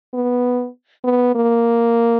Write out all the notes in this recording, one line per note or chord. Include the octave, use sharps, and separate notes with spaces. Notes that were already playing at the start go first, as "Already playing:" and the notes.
B3
B3
A#3